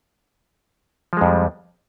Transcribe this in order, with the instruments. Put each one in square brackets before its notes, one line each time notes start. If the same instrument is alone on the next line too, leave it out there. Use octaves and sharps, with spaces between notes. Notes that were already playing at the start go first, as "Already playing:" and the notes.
[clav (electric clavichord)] F3
G#3
F2
G3